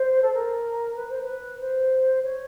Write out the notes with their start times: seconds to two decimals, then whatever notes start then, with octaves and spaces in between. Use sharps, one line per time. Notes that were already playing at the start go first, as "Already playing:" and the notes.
Already playing: C5
0.22 A4
0.33 A#4
0.96 B4
1.09 C5
1.22 B4
1.60 C5
2.23 C#5